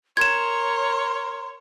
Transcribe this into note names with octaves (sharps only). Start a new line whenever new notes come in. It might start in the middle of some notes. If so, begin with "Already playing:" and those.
A#4 C#5 C6 G#6 E7